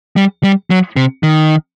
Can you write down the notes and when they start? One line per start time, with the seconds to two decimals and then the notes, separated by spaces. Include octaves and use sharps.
0.16 G3
0.43 G3
0.70 F#3
0.96 C3
1.23 D#3